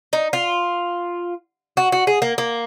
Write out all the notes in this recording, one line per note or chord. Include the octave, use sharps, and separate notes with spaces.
D#4
F4
F#4
F#4
G#4
A#3
A#3